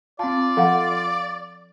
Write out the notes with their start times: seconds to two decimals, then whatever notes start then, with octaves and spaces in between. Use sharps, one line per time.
0.19 C4 F4 D5 A5
0.57 F3 A4 F5 F#5